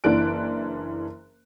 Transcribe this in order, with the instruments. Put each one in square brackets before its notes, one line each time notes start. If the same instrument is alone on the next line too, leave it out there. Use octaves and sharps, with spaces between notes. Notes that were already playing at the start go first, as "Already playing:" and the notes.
[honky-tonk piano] F#1 E3 D4 F#6 D7